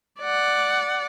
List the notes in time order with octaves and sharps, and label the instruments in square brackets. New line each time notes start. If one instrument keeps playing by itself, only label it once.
[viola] D5 F#5